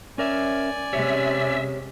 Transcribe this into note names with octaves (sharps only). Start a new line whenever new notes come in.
C#4 A#4 D5 E5 G#5
C3 G#3 C#4 G4 C#5 E5